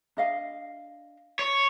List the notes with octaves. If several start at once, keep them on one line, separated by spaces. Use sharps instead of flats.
D4 D#5 F5
C#5